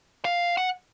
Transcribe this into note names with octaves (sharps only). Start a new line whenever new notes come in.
F5
F#5